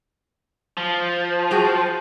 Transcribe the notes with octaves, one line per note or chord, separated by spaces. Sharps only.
F3
F#4 G#4 G5